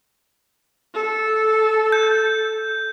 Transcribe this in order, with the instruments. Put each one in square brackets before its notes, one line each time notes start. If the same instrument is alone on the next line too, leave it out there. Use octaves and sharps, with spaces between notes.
[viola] A4
[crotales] G6